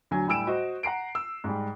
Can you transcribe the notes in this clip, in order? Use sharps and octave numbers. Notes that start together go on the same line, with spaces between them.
D2 F#3 G#5
A2 G3 G#5 E6 D7 E7
F#4 C5 D#5
F#5 A#5 C7 D7
E6
G#2 G3